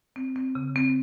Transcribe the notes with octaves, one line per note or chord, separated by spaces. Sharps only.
C4
C4
C#3
C4